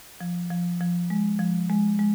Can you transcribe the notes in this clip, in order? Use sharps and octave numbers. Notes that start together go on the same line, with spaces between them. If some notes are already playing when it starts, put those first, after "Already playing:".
F3
F3
F3
G#3
F3
G#3
G#3